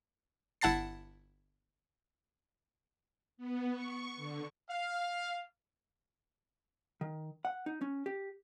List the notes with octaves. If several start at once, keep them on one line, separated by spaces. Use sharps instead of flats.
G1 E4 F#5 A5 A6 C7
B3
C#6
D3
F5
D#3
F#5
D#4
C#4
G4